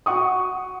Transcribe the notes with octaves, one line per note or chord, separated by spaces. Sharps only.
F#4 F#5 C#6 D#6